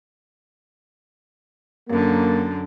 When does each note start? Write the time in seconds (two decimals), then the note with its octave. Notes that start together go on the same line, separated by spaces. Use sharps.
1.89 F#2 D3 A#3